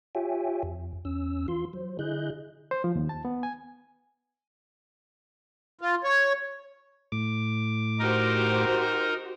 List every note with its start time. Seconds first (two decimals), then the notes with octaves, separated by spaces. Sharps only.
0.15 F4 G4 C#5 E5 G5 G#5
0.63 F2
1.05 E2 C#4 E6
1.48 E3 F4 C6
1.73 F#3 C5
1.99 D3 E4 G#4 D#5 F#6 G6
2.71 C5
2.84 F3
2.95 D#2
3.09 A5
3.25 B3
3.43 G#5
5.81 F4
6.04 C#5
7.12 A2 D6
7.99 D#4 F#4 G4 A#4 C5